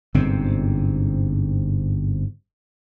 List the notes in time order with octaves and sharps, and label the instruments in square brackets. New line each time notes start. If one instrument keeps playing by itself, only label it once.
[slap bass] G1 G#2 C3 C4